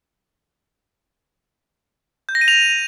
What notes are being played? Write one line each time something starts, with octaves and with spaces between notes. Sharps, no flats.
G6
A#6
D#7
F7